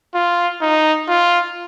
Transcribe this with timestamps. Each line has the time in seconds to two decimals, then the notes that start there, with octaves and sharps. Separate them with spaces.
0.15 F4
0.61 D#4
1.08 F4